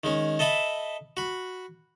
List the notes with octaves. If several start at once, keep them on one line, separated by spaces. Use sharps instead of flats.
D#3 G#3 C#4
A4 D#5 E5 A5 B5
F#4 B5